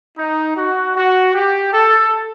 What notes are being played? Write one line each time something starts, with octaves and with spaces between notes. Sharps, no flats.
D#4
F#4
F#4
G4
A4